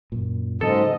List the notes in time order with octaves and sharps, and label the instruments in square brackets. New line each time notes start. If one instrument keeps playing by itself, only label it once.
[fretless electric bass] F#2 A#2
[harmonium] G#2 [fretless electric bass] C#3 F#3 A#3 [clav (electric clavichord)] A4 [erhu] D#5